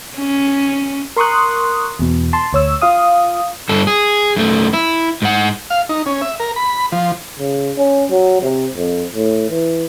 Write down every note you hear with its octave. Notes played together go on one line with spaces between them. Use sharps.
C#4
A#4 C6 C#6 D#6 F#6
E2 B2
A5 C6
D2 C#5 E6
F4 F5 D#6
G2 A4
G#4
F#2 A3
E4
G#2 F#5
F5
D#4
C#4
E5
A#4
B5
F3
C#3
C#4
F#3
C3
F2
A2
E3